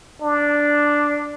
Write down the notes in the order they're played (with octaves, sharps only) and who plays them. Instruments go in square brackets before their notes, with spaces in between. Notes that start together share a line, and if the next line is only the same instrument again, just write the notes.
[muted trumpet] D4